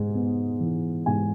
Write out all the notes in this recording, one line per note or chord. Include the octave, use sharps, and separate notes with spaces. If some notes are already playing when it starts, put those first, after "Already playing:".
Already playing: G#2 G#3
B3
E3
G#2 G#5